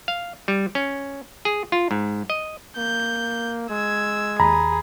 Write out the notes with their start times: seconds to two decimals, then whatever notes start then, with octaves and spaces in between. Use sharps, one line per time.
0.08 F5
0.48 G3
0.75 C#4
1.45 G#4
1.72 F4
1.91 G#2
2.30 D#5
2.77 A#3 G6
3.70 G#3 E6 G#6
4.40 D#2 G#4 A#5 B5